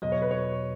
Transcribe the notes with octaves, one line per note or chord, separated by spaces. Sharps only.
E2 B2 F#3 D#5
C#5
B4
C#5